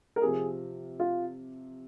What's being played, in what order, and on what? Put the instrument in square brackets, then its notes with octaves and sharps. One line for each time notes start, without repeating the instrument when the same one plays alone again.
[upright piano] A#4
[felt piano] C3 F3 C4 G4 [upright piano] G#4
[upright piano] F4